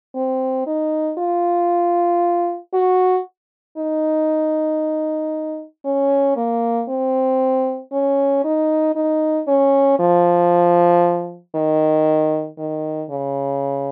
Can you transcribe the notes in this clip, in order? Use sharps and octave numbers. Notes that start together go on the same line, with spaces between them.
C4
D#4
F4
F#4
D#4
C#4
A#3
C4
C#4
D#4
D#4
C#4
F3
D#3
D#3
C#3